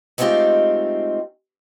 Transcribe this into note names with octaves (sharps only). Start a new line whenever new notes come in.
G#3 A3 C4 D#4 F4 G4